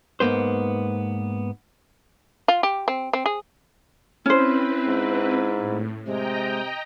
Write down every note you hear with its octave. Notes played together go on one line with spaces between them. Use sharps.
G#2 B2 A#3 B3 C5
F4
G4
C4
C4
G#4
C4 C#4 E4 B4 C5
G#2
A2
C3 G#3 D#5 G5 A#5